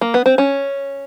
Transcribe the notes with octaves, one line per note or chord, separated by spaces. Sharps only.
A#3
B3
C4
C#4